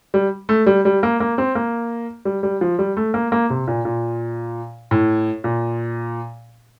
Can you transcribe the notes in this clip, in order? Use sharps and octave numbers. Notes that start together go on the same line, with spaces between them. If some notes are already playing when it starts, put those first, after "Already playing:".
G3
A3
G3
G3
A#3
A#3
C4
A#3
G3
G3
F3
G3
A3
A#3
A#3
C3
A#2
A#2
A2
A#2